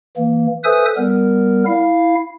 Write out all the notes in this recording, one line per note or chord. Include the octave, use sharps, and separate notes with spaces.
E3 A#3
A4 B4 C5 E5 G#5 D#6
G3 B3 A#4
E4 F5